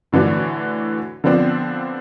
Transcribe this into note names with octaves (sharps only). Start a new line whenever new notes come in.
A2 D3 E3 D4 F#4
D3 F3 B3 C4 D4